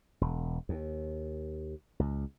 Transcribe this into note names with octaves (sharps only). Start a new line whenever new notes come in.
E1
D#2
C#2